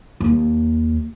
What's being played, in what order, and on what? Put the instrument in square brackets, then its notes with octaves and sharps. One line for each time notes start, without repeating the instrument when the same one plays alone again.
[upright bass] D#2